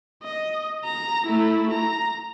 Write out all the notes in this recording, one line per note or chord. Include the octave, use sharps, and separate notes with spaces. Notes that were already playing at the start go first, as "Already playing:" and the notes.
D#5
A#5
A3 E4
A#5